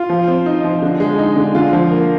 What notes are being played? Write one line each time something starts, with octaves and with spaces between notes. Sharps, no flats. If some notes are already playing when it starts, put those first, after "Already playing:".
Already playing: F4
F3
C4
D#4
F3
D3
G#3
D#4
D3
D3 F4
F3
A#3